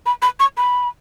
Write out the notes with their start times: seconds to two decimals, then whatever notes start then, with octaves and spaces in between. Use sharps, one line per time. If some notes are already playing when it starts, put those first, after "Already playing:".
0.06 B5
0.22 B5
0.40 C#6
0.57 B5